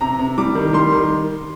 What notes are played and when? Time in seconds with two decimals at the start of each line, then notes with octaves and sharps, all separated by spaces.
0.01 C3 A#5
0.19 C3
0.38 G3 D6
0.55 D#3
0.73 G3 C6
0.92 D#3